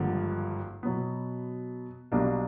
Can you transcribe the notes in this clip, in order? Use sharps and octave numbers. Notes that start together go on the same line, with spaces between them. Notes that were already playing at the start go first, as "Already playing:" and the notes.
Already playing: G#1 G2 D3 F3 A#3
B2 F#3 B3
B1 B2 G3 A#3 D4